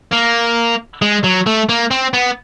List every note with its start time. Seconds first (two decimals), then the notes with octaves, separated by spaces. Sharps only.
0.13 A#3
1.02 G#3
1.24 F#3
1.46 A3
1.69 A#3
1.91 C4
2.13 B3